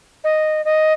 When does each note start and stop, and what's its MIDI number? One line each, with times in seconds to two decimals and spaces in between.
0.24 0.64 75
0.65 0.93 75